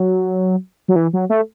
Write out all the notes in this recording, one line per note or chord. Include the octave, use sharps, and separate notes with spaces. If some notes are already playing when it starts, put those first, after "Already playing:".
Already playing: F#3
F#3
E3
F#3
A3